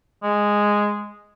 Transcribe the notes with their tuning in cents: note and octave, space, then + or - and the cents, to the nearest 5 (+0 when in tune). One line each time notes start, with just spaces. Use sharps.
G#3 -5